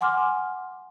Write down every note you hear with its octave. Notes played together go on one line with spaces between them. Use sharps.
F#5 G#5 C6 D6 F6